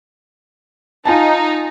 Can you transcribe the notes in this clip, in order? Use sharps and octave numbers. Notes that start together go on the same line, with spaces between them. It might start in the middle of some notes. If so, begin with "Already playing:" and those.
D#4 F4 G#5 A5